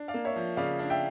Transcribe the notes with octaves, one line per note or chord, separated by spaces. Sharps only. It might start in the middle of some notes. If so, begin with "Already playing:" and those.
Already playing: D4
D5 F5
A#3
C#5 E5
F3
C#3 D5 F5
D4
E5 G5